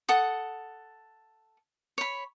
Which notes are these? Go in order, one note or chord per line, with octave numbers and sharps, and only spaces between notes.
A4 F#5 D#6
C#5 B5